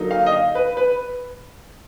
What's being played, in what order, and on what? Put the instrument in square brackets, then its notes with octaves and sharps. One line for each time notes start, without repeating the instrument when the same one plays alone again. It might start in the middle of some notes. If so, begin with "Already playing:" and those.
Already playing: [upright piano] D3 F#3 A#3 D#4
F5
D#5
F5
B4
B4